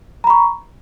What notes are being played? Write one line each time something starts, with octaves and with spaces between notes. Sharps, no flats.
A#5 B5 C#6